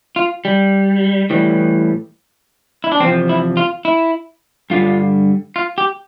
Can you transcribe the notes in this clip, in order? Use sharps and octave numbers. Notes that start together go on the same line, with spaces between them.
F4
G3
A2 E3 G3
E4
D4
E2 C3 F3 C4
E4
F4
E4
G2 D3 G3 F4
F4
G4